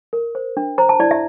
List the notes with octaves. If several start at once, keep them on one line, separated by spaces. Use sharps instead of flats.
A#4
C5
D4
C5 A#5
A5
E4 D5
E5